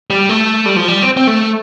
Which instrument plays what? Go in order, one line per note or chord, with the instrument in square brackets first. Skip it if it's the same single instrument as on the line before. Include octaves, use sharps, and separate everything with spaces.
[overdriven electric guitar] G3
A3
G3
F3
G3
C4
C4
A3